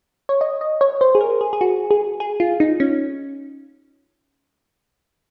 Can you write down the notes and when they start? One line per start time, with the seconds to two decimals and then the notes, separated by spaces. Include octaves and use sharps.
0.29 C#5
0.41 D#5
0.61 D#5
0.81 C#5
1.01 C5
1.15 G#4
1.21 A#4
1.41 G#4
1.53 G#4
1.61 F#4
1.91 G#4
2.20 G#4
2.40 F4
2.60 D#4
2.80 C#4